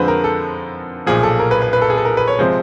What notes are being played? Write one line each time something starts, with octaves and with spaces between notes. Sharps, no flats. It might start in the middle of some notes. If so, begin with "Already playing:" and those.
Already playing: F2 D3 F3 G#3 B4 C5
A#4
A4
B1 A#2 F3 G#4
A4
A#4
B4
B4
B4
A4
G#4
A4
A#4
B4
C#5
C3 F3 G#3 C5